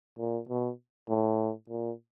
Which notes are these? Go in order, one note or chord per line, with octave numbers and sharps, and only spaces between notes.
A#2
B2
A2
A#2